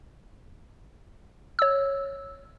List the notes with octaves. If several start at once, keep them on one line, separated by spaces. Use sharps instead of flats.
C#5 E6